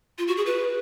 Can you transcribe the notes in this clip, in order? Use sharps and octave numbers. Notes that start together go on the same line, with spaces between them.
F4
F#4
G#4
B4